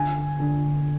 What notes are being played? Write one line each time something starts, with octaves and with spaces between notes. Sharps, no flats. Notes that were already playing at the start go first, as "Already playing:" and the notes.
Already playing: D3 G#5
D3